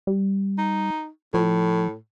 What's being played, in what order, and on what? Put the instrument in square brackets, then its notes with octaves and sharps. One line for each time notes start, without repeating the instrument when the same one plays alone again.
[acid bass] G3
[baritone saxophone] D#4
[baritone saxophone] A2 [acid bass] F3